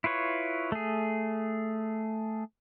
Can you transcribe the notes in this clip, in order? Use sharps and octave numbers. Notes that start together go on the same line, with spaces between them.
E4 F4 B4 C#5
A3 G#4